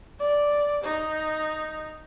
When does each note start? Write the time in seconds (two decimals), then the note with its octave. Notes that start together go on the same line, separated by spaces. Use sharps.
0.20 D5
0.85 D#4